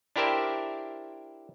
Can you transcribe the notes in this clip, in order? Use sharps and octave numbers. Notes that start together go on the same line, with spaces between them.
D4 E4 G4 A#4 C5 E5